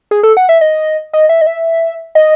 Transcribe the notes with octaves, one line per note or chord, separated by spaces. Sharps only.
G#4
A4
F#5
E5
D#5
D#5
E5
D#5
E5
D#5